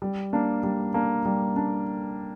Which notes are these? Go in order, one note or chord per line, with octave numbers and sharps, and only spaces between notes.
G3
A#3 D4
G3
A#3 D4
G3
D4